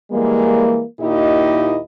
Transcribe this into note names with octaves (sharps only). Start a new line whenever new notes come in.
E3 G3 G#3 A#3
D#2 A#2 D#4 E4 G4 D#5